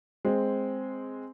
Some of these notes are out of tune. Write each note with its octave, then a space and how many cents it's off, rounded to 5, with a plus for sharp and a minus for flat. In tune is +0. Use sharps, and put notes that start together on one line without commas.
G#3 +0 C4 +0